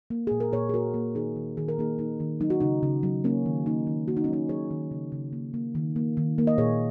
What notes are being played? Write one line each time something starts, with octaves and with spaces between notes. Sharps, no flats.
A#3
A#2 G#4
A#4
A#2 G#4 C#5
G#4
A#3 F#4 A#4
A#3
D#3 D#4 G#4
D#3
D#3 G#4
A#4
A#3 D#4 G#4
A#3 D#4
D#3
F#3 D#4
F#4
C#3 D#4
C#3
F#3
A#3 C#4
D#3
A#3 D#4
D#3
A#3 F#4
D#4
C#4
F#3 D#4
F#3 G#4 C#5
D#3
C#3
C#3
A#3
A#3
D#3
A#3
D#3
A#3
D#5
A#2 G#4 C#5